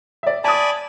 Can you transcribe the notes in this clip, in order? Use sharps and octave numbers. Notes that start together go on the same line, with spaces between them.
D5 E5
D5 G#5 A5 B5 D#6